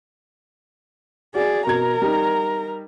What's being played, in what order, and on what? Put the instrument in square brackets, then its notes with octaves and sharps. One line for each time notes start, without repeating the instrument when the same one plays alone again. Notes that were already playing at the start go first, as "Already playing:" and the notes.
[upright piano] F#4 [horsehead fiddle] G#4 D5
[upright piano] B2 G#6 [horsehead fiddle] A#4 A#5
[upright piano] G3 D#4